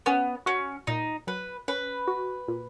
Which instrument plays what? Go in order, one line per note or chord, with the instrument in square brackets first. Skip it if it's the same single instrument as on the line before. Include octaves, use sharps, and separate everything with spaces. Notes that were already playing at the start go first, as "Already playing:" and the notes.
[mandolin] B3 [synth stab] C#4
[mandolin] C#4 [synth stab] F#4
[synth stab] A#2 [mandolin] D#4
[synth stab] F#3 [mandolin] B4
[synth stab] C#4 [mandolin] B4
[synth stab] F#4
A#2